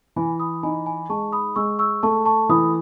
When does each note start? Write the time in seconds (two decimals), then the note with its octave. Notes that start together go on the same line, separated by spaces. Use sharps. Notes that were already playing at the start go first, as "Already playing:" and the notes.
0.16 E3 G#5 B5
0.40 B5 D#6
0.63 D#4 G#5 B5
0.86 G#5 B5
1.09 G#3 A5 C#6
1.32 B5 D#6
1.56 G#3 C#6 E6
1.79 C#6 E6
2.03 A3 A5 C#6
2.26 A5 C#6
2.49 E3 B5 D#6